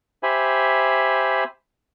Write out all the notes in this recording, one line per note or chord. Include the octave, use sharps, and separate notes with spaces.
G4 C5 E5 G#5 B5